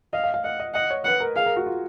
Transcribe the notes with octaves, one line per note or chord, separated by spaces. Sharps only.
D#5 F5
F5
F5
D#5 F#5
D#5
D#5 F#5
C#5
B4 F#5
A#4
G#4 F5
A#4
F#4
F4